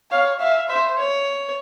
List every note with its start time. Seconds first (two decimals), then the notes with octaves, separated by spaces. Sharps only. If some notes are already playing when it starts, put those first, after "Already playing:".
0.11 C#5 F5
0.40 E5 F5
0.69 C5 E5
0.99 C#5